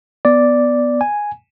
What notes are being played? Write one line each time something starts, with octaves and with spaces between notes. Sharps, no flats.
B3 D5
G#5